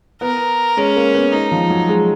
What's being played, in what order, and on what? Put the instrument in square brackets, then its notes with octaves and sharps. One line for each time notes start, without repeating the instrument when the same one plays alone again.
[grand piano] B3 [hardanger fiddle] A#4
[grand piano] G#3 [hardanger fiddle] C#4
[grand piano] A#3
B3
[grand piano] G#3 [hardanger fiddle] D#4
[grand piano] F3
F#3
G#3